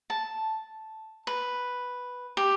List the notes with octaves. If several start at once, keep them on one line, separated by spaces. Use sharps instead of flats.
A5
B4
G4